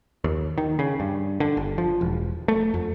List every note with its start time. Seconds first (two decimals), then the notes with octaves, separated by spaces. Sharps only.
0.24 D#2
0.58 D#3
0.79 C#3
1.00 G2
1.40 D3
1.57 G1
1.78 F3
2.01 E1
2.48 A3
2.74 F2